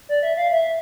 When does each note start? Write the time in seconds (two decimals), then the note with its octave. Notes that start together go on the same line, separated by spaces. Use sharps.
0.09 D5
0.23 E5
0.37 F5
0.52 E5